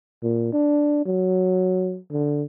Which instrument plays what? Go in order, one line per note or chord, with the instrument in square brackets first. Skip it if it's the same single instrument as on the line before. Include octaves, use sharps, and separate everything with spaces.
[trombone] A#2
D4
F#3
D3